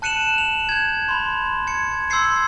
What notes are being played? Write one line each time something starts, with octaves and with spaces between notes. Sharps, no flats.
A5 F#6 C#7 D#7 E7 F#7
F7
G6 G#6
B5 C6
G#6 C#7
C6 E6 G6 G#6 C7 C#7